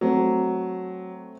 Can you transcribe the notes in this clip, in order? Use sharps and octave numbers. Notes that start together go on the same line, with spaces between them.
F#3 A3 C4